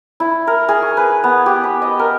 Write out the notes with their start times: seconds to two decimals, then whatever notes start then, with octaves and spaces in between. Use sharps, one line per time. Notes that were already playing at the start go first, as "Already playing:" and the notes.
0.20 E4
0.47 A#4
0.69 G#4
0.82 C#6
0.97 B4
1.24 B3
1.46 G4
1.64 B5
1.82 D#5
1.99 A#4